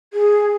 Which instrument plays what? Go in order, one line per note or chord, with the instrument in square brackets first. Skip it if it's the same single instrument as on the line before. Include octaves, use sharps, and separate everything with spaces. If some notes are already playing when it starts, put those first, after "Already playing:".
[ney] G#4